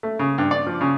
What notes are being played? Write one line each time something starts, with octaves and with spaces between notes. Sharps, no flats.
A3
C#3
G2
D5
F3
C#3